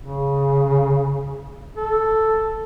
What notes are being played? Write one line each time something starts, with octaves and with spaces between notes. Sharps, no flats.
C#3
A4